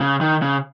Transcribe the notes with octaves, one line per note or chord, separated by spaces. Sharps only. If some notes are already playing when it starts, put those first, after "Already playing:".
C#3
D#3
C#3